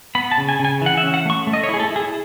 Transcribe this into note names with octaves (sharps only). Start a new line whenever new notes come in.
B3 B5
A5
C#3
G#5
C#3
G#5
E3 F#5
E5
C#4
F#5
A3 C#6
A3
D#5
C#5
E4
G#4
A4
E4
G#4